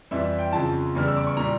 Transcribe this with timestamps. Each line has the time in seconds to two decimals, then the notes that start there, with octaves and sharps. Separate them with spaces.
0.11 F2 E3 G3 E5
0.24 E5
0.39 G5
0.52 F2 C#3 F3 A5
0.95 E2 C#3 E3 G3 F6
1.08 E6
1.17 D6
1.27 C#6
1.37 A#2 G3 A#5